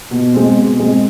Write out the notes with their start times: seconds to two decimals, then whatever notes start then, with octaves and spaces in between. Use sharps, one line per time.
0.11 B2
0.34 G#3 C4
0.57 B2
0.80 G#3 C4